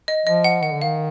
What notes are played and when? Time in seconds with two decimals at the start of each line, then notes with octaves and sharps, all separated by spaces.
0.08 D#5
0.26 F3 D#5
0.44 F#5
0.63 D#3 F#5
0.73 D3
0.82 D#3 F5